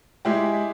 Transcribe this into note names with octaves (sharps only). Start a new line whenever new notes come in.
G#3 E4 G4